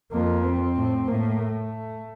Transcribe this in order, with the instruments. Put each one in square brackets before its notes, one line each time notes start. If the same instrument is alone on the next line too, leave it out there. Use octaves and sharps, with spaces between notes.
[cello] F2 [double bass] A#3
[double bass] C4
[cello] A2
[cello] A2 [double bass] A#3
[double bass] A3